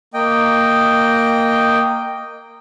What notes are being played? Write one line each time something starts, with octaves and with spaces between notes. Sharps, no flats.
A#3 D#5 G5